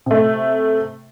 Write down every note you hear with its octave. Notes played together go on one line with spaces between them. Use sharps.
C3 A3